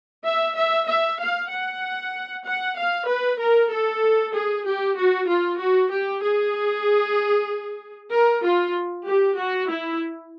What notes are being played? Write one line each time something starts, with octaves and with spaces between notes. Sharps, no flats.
E5
E5
E5
F5
F#5
F#5
F5
B4
A#4
A4
G#4
G4
F#4
F4
F#4
G4
G#4
A#4
F4
G4
F#4
E4